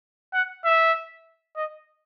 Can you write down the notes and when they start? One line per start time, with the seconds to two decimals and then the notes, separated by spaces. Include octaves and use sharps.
0.34 F#5
0.65 E5
1.56 D#5